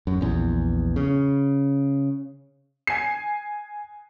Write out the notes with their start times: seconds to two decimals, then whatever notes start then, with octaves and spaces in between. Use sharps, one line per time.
0.07 F#2
0.21 A#1 E2
0.96 C#3
2.87 G#5 C7